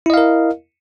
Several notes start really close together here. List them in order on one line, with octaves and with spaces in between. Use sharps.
E4 D#5 F5 A#4